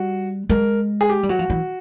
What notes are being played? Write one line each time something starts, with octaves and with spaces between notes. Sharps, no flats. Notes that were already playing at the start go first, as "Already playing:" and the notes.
Already playing: G3 F#4
G#3 A#4
G#4
G4
G3
F#3 F#4
F3
E3